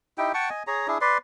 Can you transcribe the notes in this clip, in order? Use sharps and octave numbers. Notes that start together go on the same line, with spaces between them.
D#4 E4 G4 G5
F#5 G5 A5 C#6
D#5 G#5
G#4 C#5 A#5
D4 E4 G#4
B4 D5 C6